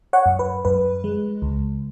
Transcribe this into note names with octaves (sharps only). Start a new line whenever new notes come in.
C#5 F#5
F#2
B4
F#2 B4
G#3
C#2